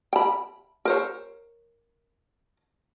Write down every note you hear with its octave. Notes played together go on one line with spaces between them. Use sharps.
G5 B5
A#4 C5 C#5